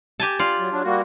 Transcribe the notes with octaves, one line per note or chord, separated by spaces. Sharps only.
G4 G#5 A5
F4 D5
F#3
F#3 D4
G3 A#3 F#4